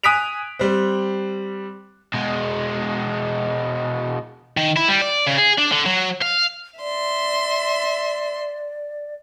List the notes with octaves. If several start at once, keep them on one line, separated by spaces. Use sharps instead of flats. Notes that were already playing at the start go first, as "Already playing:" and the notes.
G#5 D#6 F#6 B6 D7 F7
G3 C4
B2 G#3
D#3
E4
G3
D5
C#3
G#4
D4
D3
F#3
F5
D5 E5 C6